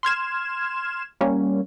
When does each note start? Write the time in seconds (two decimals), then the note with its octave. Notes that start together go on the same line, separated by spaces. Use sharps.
0.03 C6 F6 G#6 E7
1.21 G3 A#3 C#4